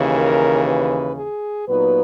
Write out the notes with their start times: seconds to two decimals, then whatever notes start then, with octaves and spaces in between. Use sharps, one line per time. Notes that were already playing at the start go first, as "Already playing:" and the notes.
Already playing: D#2 C#3 E3
0.14 A#4
0.66 B4
1.17 G#4
1.67 A#2 F#3 B3 D#4 B4